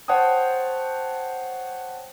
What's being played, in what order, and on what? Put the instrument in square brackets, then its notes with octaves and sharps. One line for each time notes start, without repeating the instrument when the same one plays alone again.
[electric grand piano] C5 C#5 F#5 G5 A5 D#6